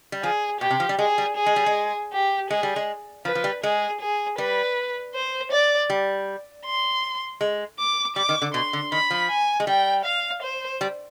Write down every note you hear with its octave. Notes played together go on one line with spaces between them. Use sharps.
G3
F3 G#4
B2 G4
C3
F3
G3
G#3 G#4
G3
G#4
G#3
G3
G#3
G4
G#3 G#4
G3
G#3
F3 B4
F3
G3
G#3 G#4
G#4
G3 B4
C5
D5
G3
C6
G#3
D6
G3 D6
D#3
D3
B2 C6
D3
D#3 B5
F3
G#5
G#3
G3 G5
F5
C5
G3